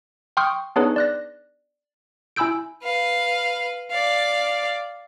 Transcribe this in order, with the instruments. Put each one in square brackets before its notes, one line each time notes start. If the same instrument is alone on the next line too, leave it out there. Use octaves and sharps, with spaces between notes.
[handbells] G5 C6 C#6 D#6 F6 G6
B3 D4 D#4 G#4 B4 C#5
D5 F#6 A#6
E4 G#5 B5 E6 G6 D7
[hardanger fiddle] B4 F5
D5 F5